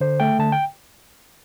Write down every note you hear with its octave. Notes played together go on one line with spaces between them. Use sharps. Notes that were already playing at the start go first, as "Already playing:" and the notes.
D3 C5
A3 G5
D3 A5
G5